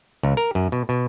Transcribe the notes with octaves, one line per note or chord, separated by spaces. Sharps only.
C#2
A#4
F#2
B2
B2